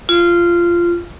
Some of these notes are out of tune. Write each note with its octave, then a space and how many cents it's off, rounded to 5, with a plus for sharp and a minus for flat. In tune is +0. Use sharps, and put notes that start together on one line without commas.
F4 -15